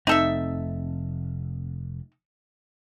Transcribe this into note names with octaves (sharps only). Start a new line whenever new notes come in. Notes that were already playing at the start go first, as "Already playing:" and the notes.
F1 A3 C4 D#4 A4 E5